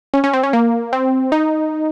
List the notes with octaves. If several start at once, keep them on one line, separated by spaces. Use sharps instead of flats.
C#4
C#4
C4
C#4
A#3
C4
D#4